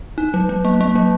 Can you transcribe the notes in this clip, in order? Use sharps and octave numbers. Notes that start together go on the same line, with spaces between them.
D#4
F#3
F#3
A#3
A#3
F#3